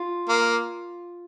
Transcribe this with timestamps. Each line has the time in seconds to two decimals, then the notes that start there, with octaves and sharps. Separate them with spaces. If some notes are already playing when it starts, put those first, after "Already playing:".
Already playing: F4
0.29 A#3